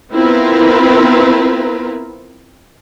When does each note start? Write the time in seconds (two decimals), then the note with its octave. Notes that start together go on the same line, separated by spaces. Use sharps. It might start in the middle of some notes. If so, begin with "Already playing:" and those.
0.12 B3 C4 E4 F4 A#4 B4